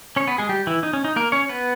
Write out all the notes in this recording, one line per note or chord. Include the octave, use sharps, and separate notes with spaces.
C#4 C#5
B3 B4
G#3 G#4
G3 G4
E3 E4
D#4
C#4
D#4
A#3 A#4
C#4 C#5
B3 B4